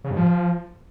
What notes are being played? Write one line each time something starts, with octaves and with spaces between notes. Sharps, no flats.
C#3
G2
F3